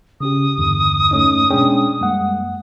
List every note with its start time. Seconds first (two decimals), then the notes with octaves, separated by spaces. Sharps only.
0.21 C#3 C#4 G4 D#6
0.58 E2 G2 D3
1.11 A3 C#4 D#4
1.51 B2 G#3 C#4 D4 G#4 G5
2.01 F#2 G3 G#3 A#3 F#5